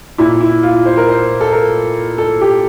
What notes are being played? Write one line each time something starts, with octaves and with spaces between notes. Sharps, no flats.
A#2 E4
E4
F4
C5
A#4
C5
A4
A#4
A4
G4